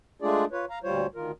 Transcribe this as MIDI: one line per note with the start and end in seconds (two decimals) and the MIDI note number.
0.22 0.45 56
0.22 0.45 57
0.22 0.45 62
0.22 0.45 65
0.22 0.45 68
0.22 0.45 74
0.52 0.65 65
0.52 0.65 71
0.52 0.65 73
0.70 0.79 77
0.70 0.79 82
0.84 1.07 38
0.84 1.07 46
0.84 1.07 55
0.84 1.07 65
0.84 1.07 72
0.84 1.07 73
1.15 1.31 38
1.15 1.31 51
1.15 1.31 65
1.15 1.31 70